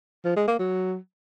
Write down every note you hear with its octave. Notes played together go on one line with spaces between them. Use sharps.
F3
G#3
A#3
F#3